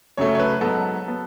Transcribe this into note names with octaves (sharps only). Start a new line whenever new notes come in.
F#2 C#3 F#3 A3 C#5
C#5
B4
G#2 F#3 B3 A4
F#3 B3